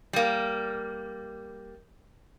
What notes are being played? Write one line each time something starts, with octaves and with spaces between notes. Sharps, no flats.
G3 A#3